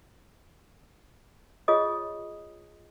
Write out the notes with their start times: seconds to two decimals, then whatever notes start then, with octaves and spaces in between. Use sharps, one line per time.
1.68 F4 G#4 C#5 D#5 D#6